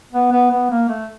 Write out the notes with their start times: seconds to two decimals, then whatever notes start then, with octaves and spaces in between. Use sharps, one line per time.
0.12 B3
0.32 B3
0.51 B3
0.70 A#3
0.89 A3